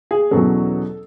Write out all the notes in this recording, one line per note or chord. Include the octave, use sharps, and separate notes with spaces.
G#4
E2 B2 F#3 C#4 A4